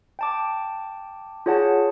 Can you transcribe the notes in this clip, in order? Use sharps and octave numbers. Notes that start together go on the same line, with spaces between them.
G5 A5 D6
F4 G#4 C#5 F#5 A5